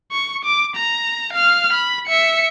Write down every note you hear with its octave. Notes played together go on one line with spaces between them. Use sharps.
C#6
D6
A#5
F5 F6
B5
E5 C#7